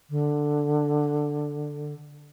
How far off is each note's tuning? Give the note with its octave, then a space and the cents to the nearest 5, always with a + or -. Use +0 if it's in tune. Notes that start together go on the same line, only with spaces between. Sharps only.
D3 +5